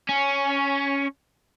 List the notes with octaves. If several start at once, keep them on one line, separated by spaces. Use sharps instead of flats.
C#4